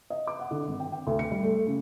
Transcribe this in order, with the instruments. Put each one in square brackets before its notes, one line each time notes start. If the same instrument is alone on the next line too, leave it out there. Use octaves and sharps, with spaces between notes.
[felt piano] D#5
D6
F#5
D3
G#1
G5
G5
D2
C#7
G3
A3
C#3